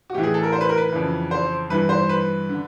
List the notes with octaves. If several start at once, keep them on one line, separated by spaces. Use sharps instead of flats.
F#4
A2 E3 G4
G#4
A4
A#4
C5
B4
A#4
B4
F2 C#3 E3
C5
G2 E3 B4
C5
B4
D3